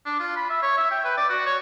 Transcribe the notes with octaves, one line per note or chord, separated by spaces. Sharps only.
D4
F4
B5
E5
C#5
E5
G5
B4
D5
F#4
C#5